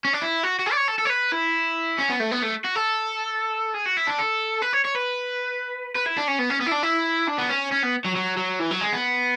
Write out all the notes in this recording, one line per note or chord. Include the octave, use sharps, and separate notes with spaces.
C#4
D4
E4
F#4
F#4
G#4
D5
C#5
A4
A4
C#5
B4
E4
C#4
B3
A3
B3
A3
F#4
A4
G#4
F#4
E4
D4
A4
B4
C#5
C#5
B4
B4
E4
D4
C#4
B3
C#4
B3
E4
D4
E4
D4
B3
C#4
C#4
B3
F#3
F#3
F#3
E3
F#3
G#3
B3